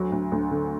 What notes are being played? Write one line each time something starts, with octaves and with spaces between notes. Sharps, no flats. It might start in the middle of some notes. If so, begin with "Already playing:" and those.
Already playing: D2 F#3
D2
D2
D3